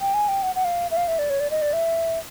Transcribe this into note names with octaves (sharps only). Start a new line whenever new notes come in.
G5
G#5
G5
F#5
F#5
F5
E5
F5
E5
D5
C#5
D5
D#5
D5
E5